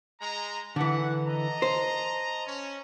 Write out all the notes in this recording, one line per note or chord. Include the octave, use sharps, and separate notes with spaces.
G#3 A#5
D3 E3 F#5
D#5 A5 A#5
C5
C#4